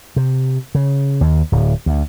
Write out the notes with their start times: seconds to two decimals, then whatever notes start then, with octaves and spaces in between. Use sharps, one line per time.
0.16 C3
0.75 C#3
1.21 D#2
1.52 D1
1.86 D2